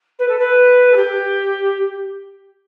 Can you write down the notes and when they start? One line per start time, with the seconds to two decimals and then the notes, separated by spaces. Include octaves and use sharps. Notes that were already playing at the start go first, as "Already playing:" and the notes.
0.18 B4
0.28 A4
0.38 B4
0.91 A4
0.96 G4